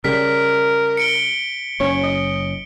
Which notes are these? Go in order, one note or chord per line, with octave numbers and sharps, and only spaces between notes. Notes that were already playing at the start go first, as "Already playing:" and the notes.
C#3 G3 A#4 B6
C#7 D7 G7
F#1 C#4 C#5
D#5